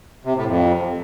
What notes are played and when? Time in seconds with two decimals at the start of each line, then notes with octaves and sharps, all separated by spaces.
0.25 C3
0.35 A2
0.46 F2